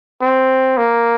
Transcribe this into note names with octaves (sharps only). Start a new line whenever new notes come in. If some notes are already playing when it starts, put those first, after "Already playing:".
C4
A#3